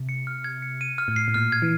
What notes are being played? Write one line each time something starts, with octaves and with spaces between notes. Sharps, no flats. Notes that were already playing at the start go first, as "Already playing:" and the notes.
Already playing: C3
C#7
F6
G#6
C#7
D#7
F6
A2
C7
A2
A#2 F6
G#6
E3